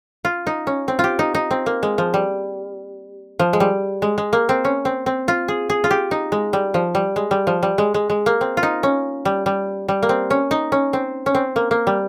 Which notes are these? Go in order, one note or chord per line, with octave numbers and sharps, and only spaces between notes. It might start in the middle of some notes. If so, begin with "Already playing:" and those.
F4
D#4
C#4
C4
F4 G4
D#4
D#4
C4
A#3
G#3
F3
G3
F3
G#3
G3
G#3
G#3
A#3
C4
C#4
C4
C4
F4
G#4
G#4
F4
G4
D#4
G#3
G3
F3
G3
G#3
G3
F3
G3
G#3
G#3
G#3
A#3
C4
F4
D#4
C#4
G3
G3
G3
A#3
C4
C#4
D#4
C#4
C4
C#4
C4
A#3
A#3
G3